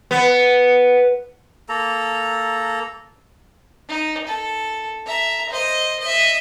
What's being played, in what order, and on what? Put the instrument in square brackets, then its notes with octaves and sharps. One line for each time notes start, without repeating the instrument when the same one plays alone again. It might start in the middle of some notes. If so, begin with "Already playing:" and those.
[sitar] B3
[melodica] A#3 A4 A#5
[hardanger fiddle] D#4
A4
E5 A#5
C5 D#5
D#5 E5